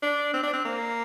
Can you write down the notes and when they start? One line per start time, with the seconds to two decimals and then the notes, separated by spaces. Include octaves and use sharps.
0.02 D4
0.34 C4
0.43 D4
0.53 C4
0.65 A#3